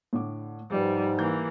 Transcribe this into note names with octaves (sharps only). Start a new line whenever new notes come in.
A2 D3 D6
G#2 F3 G3 D#4 B4
E3 A#3 G6